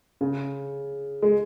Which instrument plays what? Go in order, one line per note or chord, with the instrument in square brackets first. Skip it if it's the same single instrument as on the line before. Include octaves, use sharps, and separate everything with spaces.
[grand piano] C#3
G#3